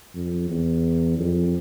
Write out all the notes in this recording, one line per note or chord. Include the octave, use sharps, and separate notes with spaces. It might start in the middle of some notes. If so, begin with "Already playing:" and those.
F2
E2
F2